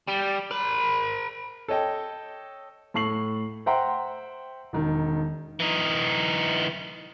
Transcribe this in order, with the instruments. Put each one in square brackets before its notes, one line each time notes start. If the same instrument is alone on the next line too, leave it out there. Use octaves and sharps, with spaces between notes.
[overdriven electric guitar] G3
A#4 B5
[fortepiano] A4 C#5 D#5 G5
[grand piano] A2 A4 C#6 C7 F#7
C5 E5 F#5 G5 A#5 C6
E1 D#3
[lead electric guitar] E3 D#4